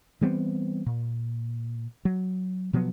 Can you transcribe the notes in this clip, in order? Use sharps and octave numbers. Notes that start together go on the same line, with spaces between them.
E3 G3 B3 C4
A#2
F#3
B2 F3 F#3 B3